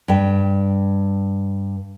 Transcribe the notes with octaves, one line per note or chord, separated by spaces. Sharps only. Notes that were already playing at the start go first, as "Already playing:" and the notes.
G2 G5